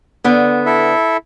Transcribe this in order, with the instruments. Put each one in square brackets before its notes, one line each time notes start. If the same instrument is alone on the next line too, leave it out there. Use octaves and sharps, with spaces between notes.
[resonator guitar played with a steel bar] D3 B3
[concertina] E4 A4 E5